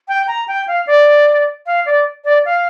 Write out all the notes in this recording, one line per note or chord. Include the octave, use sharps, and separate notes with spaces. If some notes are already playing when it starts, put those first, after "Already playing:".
G5
A#5
G5
F5
D5
F5
D5
D5
F5